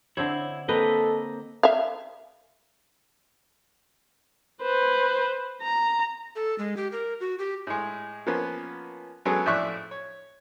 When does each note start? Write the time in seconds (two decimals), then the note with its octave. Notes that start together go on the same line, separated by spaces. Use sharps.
0.17 D3 C4 E4 C#5
0.69 A#3 C4 A4 B4 D#5
1.63 E5 F5
4.62 B4 C5
5.62 A#5
6.36 A4
6.58 G#3
6.77 G4
6.92 A#4
7.20 F#4
7.39 G4
7.67 A2 G#3
8.27 F3 A#3 B3 C#4
9.25 F#3 G#3 B3 C#4 G#4 A4
9.46 F2 A2 D5 E5 C#6 F#6
9.91 C#5